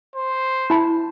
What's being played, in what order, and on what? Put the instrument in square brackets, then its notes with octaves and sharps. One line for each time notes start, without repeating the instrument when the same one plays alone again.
[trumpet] C5
[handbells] E4 A5 B5